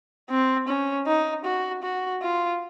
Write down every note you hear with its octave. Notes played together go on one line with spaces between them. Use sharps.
C4
C#4
D#4
F#4
F#4
F4